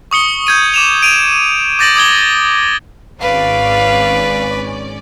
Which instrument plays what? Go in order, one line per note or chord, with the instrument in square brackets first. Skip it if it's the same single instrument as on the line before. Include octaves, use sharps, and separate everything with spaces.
[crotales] C#6 D#6 C#7 G7
G6 G#6 D#7
D6 E7 F7
D7 D#7 F7
D6 G6 A6 A#6 D7 F#7
D6 D#6 G#6 G7
[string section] G#1 C#4 D5 [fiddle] B4 [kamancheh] F5